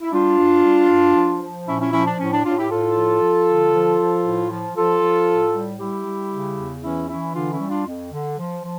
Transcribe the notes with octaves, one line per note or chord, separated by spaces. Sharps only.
E4
G3 D4 F4
G2
G3
G2
F3
F3
A#2 C#4 E4
C#4 E4
F3 C#4 E4
D4
A2 C#4
D4
A2 D4 F4
E4 G4
A2 F4 A4
F3
F3
D3
F3
F3
A2
F3
F3 F4 A4
F3
A2
G3
G3 E4 G4
G3
C#3
E2
E3 C#4 E4
E3 C#4 E4
D3 D4 F4
C#4 E4
G3
D4 F4
F2
D3
F3
F3